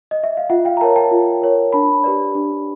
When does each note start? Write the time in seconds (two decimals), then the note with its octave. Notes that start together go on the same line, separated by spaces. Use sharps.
0.11 D#5
0.23 E5
0.37 F5
0.49 F4 E5 F#5
0.65 F5 G5
0.77 A#5
0.81 A#4 C#5 G5 A5
0.96 G5 A5
1.11 F4
1.42 A#4 C#5
1.73 D4 A5 B5
2.04 G4 B4 D5
2.35 D4